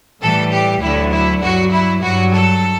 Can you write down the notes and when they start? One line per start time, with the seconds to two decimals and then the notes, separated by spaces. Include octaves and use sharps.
0.22 A2 E3 G3 A4
0.52 G4
0.82 D2 D3 F#3 E4
1.11 E4
1.41 G2 F#3 F#4
1.71 E4
2.02 G2 F#3 F#4
2.32 A4